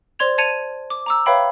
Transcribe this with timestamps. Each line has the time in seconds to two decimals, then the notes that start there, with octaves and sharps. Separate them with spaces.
0.19 C5 D5 C6 G#6 F7
0.38 A5 G#6 A6 C#7 D#7 F7
0.90 D6
1.06 A#5 D6 E6
1.26 B4 C#5 E5 F5 G5 B5